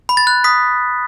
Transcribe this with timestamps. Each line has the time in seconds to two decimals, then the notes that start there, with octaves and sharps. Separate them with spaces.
0.09 B5
0.17 A6
0.27 F#6
0.44 D#6 B6